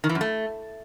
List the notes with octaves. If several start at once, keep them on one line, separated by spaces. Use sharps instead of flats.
D#3
E3
F#2
A3